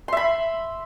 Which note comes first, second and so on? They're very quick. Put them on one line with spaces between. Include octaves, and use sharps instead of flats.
C6 E5 B5